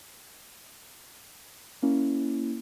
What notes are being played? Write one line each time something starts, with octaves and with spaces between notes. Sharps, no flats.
A#3 C#4 E4